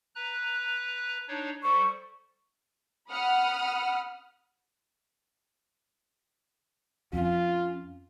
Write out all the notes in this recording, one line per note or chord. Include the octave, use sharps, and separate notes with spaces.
B4 A#5 F#6
D4 D#4 C#5
G3 A4 C5 C#6
F#5 B5 D#6 F6
F2 C#4 F4